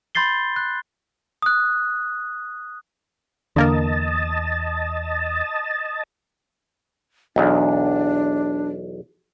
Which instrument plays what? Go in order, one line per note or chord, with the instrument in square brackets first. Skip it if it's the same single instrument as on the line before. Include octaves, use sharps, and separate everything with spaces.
[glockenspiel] B5 C6 G6 A6 C7 G7
F#6
D#6 F#6
[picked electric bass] E2 [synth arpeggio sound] D3 A#3 A#4 [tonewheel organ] D#5 A5
[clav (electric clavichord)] B1 E2 [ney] D4